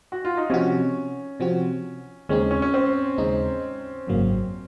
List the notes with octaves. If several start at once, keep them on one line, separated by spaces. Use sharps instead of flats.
F#4
F4
D#4
C3 F3 C4 C#4 F#4
C3 F3 C4 F#4
D#2 C#3 G#3 C4 C#4 D#4
C#4
C#4
C4
D#2 C#3 G#3 C4 D#4
G#1 F#2 C#3 F#3 A#3